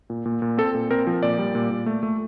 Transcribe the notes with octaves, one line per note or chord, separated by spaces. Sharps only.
A#2
A#2
A#2
C4 A4
A#2
C4 A#4
F3
A#2 D5
G3
A#2
A#2
A3
A3